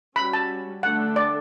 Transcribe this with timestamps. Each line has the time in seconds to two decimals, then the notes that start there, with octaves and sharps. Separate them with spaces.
0.16 G3 C#4 F#4 B5
0.33 A5
0.83 D3 A3 D4 A4 F#5
1.16 D5